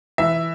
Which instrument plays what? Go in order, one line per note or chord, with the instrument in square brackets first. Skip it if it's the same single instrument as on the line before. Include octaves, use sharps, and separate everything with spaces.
[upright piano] E3 E5